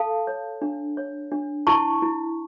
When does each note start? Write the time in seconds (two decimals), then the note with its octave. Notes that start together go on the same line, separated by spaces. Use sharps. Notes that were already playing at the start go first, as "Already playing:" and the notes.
Already playing: A4 F5 A5
0.27 C#5
0.62 D4
0.97 C#5
1.32 D4
1.67 E4 A5 C#6
2.02 E4